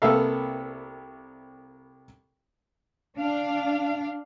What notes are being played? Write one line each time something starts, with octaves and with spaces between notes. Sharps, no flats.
C2 A#3 B3 A4 E5 F5
D4 F5